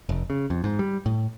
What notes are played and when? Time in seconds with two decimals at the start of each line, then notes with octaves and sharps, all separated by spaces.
0.09 F1
0.30 C#3
0.50 F2
0.64 G#2
0.79 G3
1.06 A2